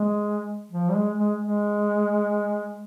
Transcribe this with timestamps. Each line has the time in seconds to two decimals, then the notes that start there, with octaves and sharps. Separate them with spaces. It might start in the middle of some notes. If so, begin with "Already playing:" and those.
Already playing: G#3
0.72 F3
0.89 G3
0.95 G#3
1.18 G#3
1.40 G#3